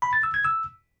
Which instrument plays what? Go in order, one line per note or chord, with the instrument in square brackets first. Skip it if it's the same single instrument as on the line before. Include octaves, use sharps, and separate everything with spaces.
[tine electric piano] B5
A6
E6
G#6
E6